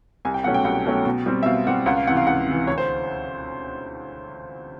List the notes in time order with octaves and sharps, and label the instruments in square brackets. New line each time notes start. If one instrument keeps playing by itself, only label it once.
[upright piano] C2 G#5
G5
B2 F#3 A3 C#4 F#5
G5
C2 F#5
B2 F#3 A3 C#4
B2
G3 C4
E5
B2 F5
G3 C4 F#5
C#2 F#5
F5
C3 E3 F#5
F5
C#2 F#5
C3 E3
D2 C#5
C5